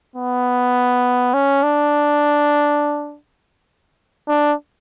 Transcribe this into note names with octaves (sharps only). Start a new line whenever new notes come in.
B3
C#4
D4
D4